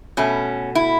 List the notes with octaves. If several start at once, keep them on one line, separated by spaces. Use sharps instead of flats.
B2 A3 C#4
E4